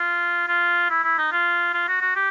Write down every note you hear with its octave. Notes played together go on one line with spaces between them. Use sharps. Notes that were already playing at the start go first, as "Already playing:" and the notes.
Already playing: F4
F4
E4
E4
D#4
F4
F4
F#4
F#4
G4